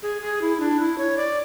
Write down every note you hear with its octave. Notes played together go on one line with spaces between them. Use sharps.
G#4
G#4
E4
D4
E4
C#5
D5